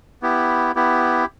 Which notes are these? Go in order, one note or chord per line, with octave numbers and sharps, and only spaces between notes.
B3 E4 G4
B3 E4 G4